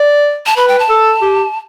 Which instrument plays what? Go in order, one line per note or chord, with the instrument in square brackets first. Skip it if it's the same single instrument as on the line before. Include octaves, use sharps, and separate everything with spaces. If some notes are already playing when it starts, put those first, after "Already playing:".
Already playing: [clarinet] D5
[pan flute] A5
[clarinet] B4 [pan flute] B5
[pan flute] G5
A5
[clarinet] A4
G4